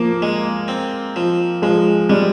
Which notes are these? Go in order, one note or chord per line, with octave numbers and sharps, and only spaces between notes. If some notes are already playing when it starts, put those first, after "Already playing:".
Already playing: F3 A#3
G#3
C4
F3
F3 G#3
G3 G#3